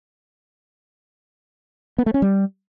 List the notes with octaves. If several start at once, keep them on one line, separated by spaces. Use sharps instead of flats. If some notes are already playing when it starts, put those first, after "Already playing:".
B3
A3
C#4
G3